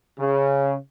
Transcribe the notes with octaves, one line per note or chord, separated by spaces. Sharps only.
C#3